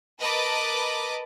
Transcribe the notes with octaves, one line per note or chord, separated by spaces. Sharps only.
A#4 B4 D#5 A5 B5 D6